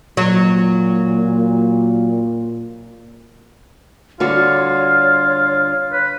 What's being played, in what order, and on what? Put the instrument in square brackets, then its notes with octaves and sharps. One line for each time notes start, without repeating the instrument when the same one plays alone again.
[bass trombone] A#2 [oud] F#3
[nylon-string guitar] D3 G3 F#4 [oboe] F4 [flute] C#5
[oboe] B4